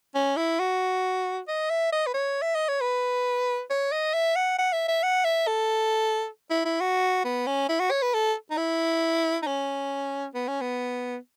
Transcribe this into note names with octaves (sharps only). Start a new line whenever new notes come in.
C#4
E4
F#4
D#5
E5
D#5
B4
C#5
E5
D#5
C#5
B4
C#5
D#5
E5
F#5
F#5
E5
E5
F#5
E5
A4
E4
E4
F#4
B3
C#4
E4
F#4
C#5
B4
A4
D#4
E4
D#4
C#4
B3
C#4
B3